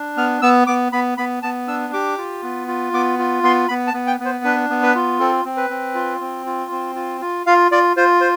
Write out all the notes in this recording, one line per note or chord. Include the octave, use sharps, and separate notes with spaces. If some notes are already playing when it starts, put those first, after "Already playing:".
Already playing: D4
B3 F6
B3 E6
B3 D6
B3 B5
B3 B5
B3 A5
D4 E6
G4 D6
F4
B3
F4
B3 D6
F4
B3 C6
B3 B5
A5
B3
G5
B3
C5
D4 B4
B3
B4
F4
C4 A4
C4
B4
C4
F4
C4
F4
C4
F4
F4
F4 F5
F4 D5
F4 C5
C5